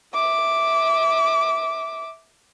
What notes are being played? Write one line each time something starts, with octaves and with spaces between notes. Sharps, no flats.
E5 D6